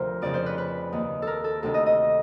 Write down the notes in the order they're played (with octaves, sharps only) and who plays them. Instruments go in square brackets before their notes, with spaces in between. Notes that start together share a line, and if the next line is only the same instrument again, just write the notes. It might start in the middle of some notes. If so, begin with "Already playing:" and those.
Already playing: [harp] D2 C3 F3 A#4 C5
F2 C#3 F3 D5
C5
B4
B4
D#2 D#3
A4 A#4
A4
D2 C3 D#3 A4
D#5
D#5